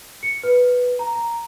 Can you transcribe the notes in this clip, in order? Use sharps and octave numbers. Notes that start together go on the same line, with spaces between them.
C#7
B4
A#5
A#5